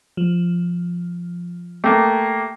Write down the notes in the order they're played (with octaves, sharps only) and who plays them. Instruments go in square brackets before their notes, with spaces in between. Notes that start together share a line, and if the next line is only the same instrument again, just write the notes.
[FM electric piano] F3
[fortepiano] A3 A#3 [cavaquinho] G4 G#4